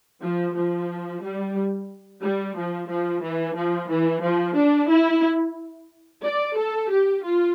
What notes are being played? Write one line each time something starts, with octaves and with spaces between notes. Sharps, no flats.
F3
F3
G3
G3
F3
F3
E3
F3
E3
F3
D4
E4
D5
A4
G4
F4